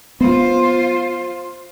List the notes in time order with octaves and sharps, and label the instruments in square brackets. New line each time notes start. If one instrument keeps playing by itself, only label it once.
[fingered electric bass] B3 [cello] F4 C5